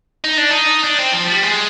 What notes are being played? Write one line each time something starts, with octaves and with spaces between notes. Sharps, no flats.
D#4
D4
D#4
D4
C4
F3
G3
G#3